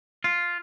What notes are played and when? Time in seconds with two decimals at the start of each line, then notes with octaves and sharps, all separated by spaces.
0.24 F4